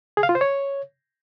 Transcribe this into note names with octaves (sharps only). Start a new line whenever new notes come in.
G#4
F5
F4
C5
C#5